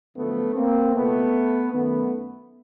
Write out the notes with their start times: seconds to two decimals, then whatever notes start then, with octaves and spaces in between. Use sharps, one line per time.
0.16 F#2 D3 F3 A3 B3
0.55 A#3 C4
0.94 C#2 B2 A3 B3
1.72 F#2 D#3 A3 B3